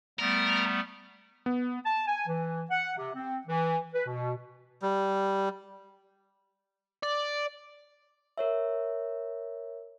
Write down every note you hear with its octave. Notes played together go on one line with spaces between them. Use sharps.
G3 A3 B3 A#4
B3
A5
G#5
E3
F#5
C3
C4
E3
B4
B2
G3
D5
A#4 C#5 E5